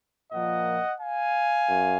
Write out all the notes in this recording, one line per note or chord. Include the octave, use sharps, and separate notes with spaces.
A#2 F3 A#3 D#5 F#5
F5 G#5
F#2